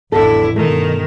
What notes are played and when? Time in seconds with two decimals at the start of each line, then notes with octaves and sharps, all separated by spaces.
0.12 A1 F2 D3 B3 E4 A4
0.56 G2 B2 D#3 A3